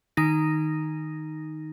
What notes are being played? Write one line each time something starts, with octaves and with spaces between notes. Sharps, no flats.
D#3 D#4 A#6